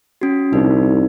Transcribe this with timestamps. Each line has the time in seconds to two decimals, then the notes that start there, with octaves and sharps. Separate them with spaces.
0.21 C#4 F#4
0.53 C2 D#4